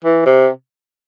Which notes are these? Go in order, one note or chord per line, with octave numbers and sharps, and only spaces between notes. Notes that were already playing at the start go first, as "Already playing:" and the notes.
E3
C3